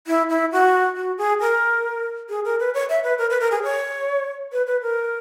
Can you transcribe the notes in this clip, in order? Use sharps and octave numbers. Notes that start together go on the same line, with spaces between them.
E4
E4
F#4
F#4
G#4
A#4
G#4
A#4
B4
C#5
E5
B4
A#4
B4
A#4
G#4
C#5
B4
B4
A#4